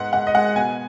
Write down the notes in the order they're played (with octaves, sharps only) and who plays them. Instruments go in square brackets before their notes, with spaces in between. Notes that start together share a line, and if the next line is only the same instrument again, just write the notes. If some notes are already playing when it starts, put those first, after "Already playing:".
Already playing: [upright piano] G#2 B3 F#5
G#2 F#5
D#5
G#3 F#5
B2 G#5